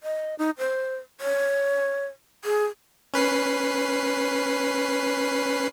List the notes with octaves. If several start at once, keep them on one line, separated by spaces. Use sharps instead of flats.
D#5
D#4
C5
C#5
G#4
C#4 B4 C7